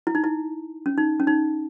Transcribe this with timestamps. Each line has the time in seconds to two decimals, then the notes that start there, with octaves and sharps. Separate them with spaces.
0.07 E4
0.15 D#4
0.24 E4
0.86 C#4
0.98 D#4
1.20 C#4
1.27 D#4